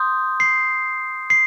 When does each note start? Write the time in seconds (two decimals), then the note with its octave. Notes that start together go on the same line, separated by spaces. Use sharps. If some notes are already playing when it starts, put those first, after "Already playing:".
Already playing: C6 D#6 G6
0.40 C7
1.30 C7